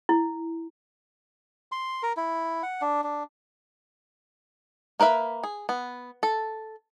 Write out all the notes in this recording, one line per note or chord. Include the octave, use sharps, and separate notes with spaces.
E4
C6
A#4
E4
F#5
D4
D4
A#3 A#4 B4 E5
G#4
B3
A4